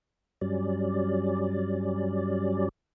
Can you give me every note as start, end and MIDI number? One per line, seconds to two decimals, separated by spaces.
0.41 2.69 43
0.41 2.69 54
0.41 2.69 55
0.41 2.69 61
0.41 2.69 74